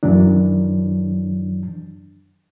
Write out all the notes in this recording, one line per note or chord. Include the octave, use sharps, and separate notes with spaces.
F#2 D#3 E3 F#3 D4